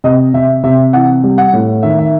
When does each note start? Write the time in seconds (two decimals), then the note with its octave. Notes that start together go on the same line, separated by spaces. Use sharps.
0.04 C3 D#5
0.34 C3 E5
0.64 C3 E5
0.93 E3 F#5
1.24 G3
1.38 F#5
1.53 A2
1.83 D#3 E5
1.99 E5